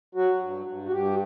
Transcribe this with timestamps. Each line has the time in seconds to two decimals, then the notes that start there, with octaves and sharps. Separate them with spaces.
0.15 F#3 F#4
0.41 G2
0.66 G2
0.86 F#4
0.92 G2 G4